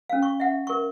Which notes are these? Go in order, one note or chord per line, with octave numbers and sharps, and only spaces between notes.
C#4 F5
C#6
E5 F#5
A#4 C#6